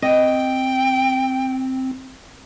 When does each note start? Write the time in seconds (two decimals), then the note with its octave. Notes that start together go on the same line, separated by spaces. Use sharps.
0.02 C4 D#5 G5